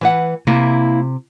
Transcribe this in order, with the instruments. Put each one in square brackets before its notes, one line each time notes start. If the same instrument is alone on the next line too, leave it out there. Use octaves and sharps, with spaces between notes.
[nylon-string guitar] E3 B4 F#5
[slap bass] C3 [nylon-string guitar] A#3 E4